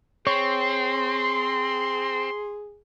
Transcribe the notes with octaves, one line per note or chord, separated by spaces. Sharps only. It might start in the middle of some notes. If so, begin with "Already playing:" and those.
C4 G#4 C#5 C6